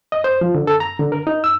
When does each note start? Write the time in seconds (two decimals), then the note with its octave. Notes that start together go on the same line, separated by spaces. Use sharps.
0.12 D#5
0.24 C5
0.41 F3
0.54 D3
0.67 A4
0.80 A#5
0.99 D3
1.12 A#4
1.27 D#4
1.44 E6